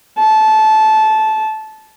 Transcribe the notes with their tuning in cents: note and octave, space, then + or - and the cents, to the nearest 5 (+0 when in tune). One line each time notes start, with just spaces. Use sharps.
A5 -15